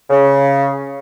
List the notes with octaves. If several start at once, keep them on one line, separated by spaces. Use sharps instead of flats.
C#3